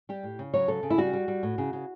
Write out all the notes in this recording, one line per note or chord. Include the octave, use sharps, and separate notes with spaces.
G3 G4
A2
C#3
F#3 C#5
C#3 A4
C#3
E4
G3 F#4
G3
G3
A2
C#3
C#3